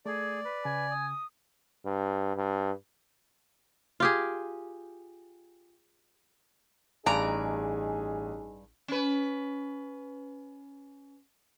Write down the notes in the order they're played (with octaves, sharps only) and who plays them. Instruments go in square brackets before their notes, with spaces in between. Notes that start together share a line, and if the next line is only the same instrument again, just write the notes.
[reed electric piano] A3 [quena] G#4 [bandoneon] D5
[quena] B4
[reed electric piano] C#3 [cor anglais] G#5
[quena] D#6
[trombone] G2
G2
[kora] F4 G4 G#4
[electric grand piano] A1 G#5 [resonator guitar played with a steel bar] G2 D5 A#5 [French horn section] D#4 G#4
[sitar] C#4 B4